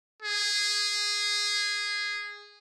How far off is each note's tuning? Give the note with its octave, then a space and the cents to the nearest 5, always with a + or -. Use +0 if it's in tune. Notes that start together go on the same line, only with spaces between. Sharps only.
G#4 -10